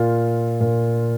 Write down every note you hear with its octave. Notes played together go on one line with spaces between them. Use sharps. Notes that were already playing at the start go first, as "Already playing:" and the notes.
Already playing: A#2 F4
A#2